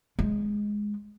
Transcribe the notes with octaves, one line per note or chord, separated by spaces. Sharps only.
G#3